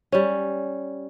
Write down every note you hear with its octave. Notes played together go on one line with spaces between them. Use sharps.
G3 C#4